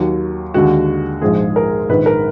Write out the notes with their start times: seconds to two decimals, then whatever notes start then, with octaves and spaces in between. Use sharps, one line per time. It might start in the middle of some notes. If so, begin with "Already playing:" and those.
Already playing: D#2 D#3 F#3
0.54 D#2 D3 G#3 F#4
1.22 A#1 G#2 F3 G#3 G#4
1.56 A#4
1.89 A#1 G#2 D#3 B4
2.06 A#4